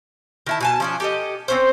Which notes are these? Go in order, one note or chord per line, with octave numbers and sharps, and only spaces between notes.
D#3 E4 A5
B2 G#5 A5
F3 C#4 D4
G4 A4 D#5
C4 C#4 C5